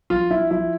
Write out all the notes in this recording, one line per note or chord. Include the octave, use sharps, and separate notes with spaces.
F3 F4
F3 E4
F3 E4